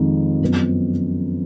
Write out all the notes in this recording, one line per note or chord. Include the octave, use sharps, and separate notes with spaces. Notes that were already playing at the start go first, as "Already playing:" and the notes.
Already playing: F2 D#3 G#3
F#2 F3 B3